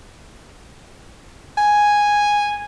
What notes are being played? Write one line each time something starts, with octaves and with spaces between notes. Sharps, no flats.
G#5